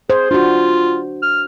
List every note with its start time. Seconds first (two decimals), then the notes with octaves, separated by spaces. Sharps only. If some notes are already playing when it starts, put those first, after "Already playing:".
0.10 G#4 C5
0.31 D4 F4 F#4
1.23 F6